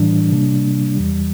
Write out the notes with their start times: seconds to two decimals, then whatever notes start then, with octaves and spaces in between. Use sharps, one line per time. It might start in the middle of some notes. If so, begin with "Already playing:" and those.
Already playing: A2 E3 G3 D4
0.31 C3 G3 A#3 D4
0.96 E2 E3 G3